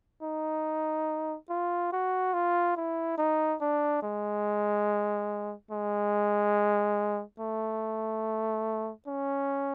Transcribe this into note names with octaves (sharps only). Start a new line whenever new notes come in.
D#4
F4
F#4
F4
E4
D#4
D4
G#3
G#3
A3
C#4